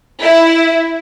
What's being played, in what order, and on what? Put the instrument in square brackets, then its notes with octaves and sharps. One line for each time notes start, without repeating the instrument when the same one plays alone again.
[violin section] E4